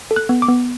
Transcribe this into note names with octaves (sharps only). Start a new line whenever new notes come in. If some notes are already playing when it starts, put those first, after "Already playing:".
A4
F#6
B3
D6
B3